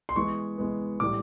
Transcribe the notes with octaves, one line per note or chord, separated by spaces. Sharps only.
C6
E3 G#3 B3 C#6
E3 G#3 B3
A2 E3 G3 D6